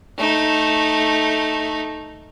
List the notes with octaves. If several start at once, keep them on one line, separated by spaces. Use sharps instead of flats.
A3 D#4